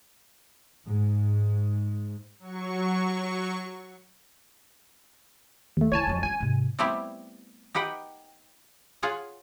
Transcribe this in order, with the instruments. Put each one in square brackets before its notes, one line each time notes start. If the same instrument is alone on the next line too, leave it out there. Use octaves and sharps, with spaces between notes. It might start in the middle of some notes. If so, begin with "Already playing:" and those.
[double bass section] G#2
[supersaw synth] F#3 C#6
[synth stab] D#2 A3
[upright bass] C#2 E4 [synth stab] C#5 G#5 A5
[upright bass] F2 F#3
[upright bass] C#4 F4 [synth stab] G#5
[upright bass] G#2 C3
[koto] G3 A3 B3 C4 E4 G4
D#4 G4 B4 F#5 G5
F4 G#4 C#5 F#5